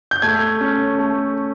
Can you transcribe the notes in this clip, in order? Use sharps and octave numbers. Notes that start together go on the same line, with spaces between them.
G6
A3 G#6
C#4
A3